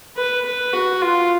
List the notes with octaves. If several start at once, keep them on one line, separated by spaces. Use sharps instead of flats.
B4
B4
F#4
F4